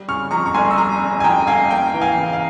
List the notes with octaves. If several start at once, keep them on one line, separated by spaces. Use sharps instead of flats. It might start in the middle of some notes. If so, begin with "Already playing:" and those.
Already playing: G3
C#3 C#6 F6
F2 A#5 C#6
C#6
G1 G#5 C6
E6
G3 A#5 C#6
C#3
G#5
F2 G5 A#5
G1 F5 G#5
A#3 G5 A#5
E3
F5 G#5
C#3
F5